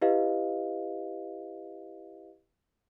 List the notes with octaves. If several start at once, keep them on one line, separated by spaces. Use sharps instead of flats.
E4 G4 B4 D#5 F5